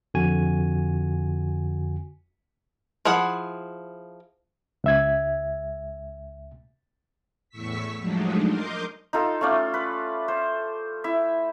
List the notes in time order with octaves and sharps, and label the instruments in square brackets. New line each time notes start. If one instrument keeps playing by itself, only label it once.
[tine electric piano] F2 D3 F#4 G#5
[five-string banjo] F3 E4 G#4 F#5
[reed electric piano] C#2 E5 G#6
[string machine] E2 A2 C#6 E6 B6
F3 F#3 G#3 A3 D4 D#4
A#4 D#5 C6 D6 G6
[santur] D#4 F4 A4
A3 C#4 F4 D5
B4
C5
E4 E5